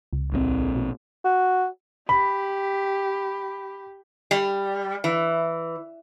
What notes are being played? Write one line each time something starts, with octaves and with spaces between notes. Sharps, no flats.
C#2
A#1 F3 C4
B2
F#4
G4 B5
G3
E3